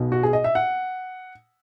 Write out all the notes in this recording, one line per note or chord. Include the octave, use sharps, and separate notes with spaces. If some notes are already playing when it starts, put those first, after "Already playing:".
Already playing: B1 B2
F#4
G#4
D#5
E5
F#5